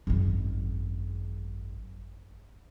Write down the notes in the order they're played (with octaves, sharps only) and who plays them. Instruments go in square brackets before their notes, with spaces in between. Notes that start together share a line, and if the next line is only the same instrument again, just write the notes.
[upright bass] G#1 F#2